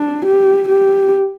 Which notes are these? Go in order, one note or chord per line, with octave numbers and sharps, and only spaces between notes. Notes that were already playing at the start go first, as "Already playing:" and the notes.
Already playing: D4
G4
G4